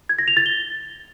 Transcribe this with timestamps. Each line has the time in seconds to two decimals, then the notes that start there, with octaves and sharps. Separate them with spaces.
0.09 G#6
0.19 A#6
0.28 F7
0.37 A6
0.46 G7